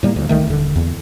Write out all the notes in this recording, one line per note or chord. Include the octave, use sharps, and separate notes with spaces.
A2 G3 A3 A#3
D2
C2 D#3 A3
D#1 D3
E2